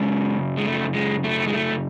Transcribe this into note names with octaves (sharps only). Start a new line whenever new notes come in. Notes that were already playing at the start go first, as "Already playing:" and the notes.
Already playing: F#2 C#3 G#3
G#3
A3
G#3
A3
G#3
A3